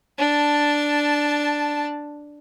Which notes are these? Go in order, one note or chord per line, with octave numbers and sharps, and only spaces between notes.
D4 A5